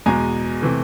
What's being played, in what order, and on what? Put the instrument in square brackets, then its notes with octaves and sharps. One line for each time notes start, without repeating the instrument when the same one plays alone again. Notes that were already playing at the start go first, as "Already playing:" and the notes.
[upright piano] E2 B2 G#3 G#5 A#5
C3 E3 A3